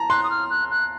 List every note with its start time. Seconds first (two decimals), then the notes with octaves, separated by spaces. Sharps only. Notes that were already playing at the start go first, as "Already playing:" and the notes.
Already playing: A5 A#5
0.10 C6 F#6
0.23 D#6
0.30 F6
0.50 F#6
0.71 F#6